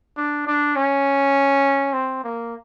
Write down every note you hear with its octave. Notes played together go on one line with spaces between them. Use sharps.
D4
D4
C#4
C4
A#3